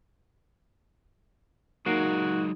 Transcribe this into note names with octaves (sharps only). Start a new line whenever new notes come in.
F#3 G#3 A#3 D#4 F#4